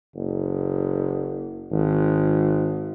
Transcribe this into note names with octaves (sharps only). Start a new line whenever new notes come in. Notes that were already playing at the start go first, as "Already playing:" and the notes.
F#1
G#1